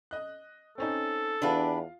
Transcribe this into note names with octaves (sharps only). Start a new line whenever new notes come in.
D#5 F#6
C4 C#4 D#4 A4
E2 D4 F4 G4 B4 F5